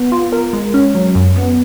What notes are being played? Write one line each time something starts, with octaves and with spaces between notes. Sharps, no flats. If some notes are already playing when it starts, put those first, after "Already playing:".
Already playing: B3
F4
A#4
G#3
C#4
F#3
F#2
B3